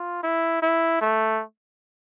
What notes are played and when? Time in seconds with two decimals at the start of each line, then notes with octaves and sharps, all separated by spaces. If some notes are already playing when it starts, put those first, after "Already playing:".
Already playing: F4
0.23 E4
0.62 E4
1.01 A3